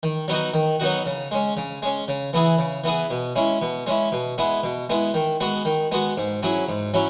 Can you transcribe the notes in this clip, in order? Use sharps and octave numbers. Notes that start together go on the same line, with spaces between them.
D#3
F#3 B3 D#4 F#4
D#3
F#3 B3 D#4 F#4
C#3
G#3 C#4
C#3
G#3 C#4
C#3
E3 B3 E4 G#4
C#3
E3 B3 E4 G#4
B2
G#3 C#4 E4
B2
G#3 C#4 E4
B2
G#3 B3 E4
B2
G#3 B3 E4
D#3
G#3 B3 F#4
D#3
G#3 B3 F#4
G#2
F#3 C#4 E4 G#4
G#2
F#3 C#4 E4